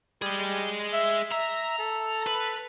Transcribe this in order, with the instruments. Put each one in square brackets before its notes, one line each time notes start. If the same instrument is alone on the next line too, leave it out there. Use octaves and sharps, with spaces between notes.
[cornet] G3 [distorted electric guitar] G#4 D#5
[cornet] E5
[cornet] E5 [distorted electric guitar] A#5
[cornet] A4
[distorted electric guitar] B4